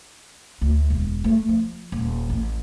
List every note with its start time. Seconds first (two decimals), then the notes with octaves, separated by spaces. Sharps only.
0.61 D2
0.90 E1
1.24 A3
1.49 F3
1.92 D#1
2.29 A1